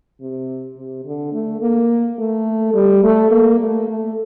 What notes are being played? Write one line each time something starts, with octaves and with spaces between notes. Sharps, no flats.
C3
C3
D3
A3
A#3
A3
G3
A3
A#3
A3
A3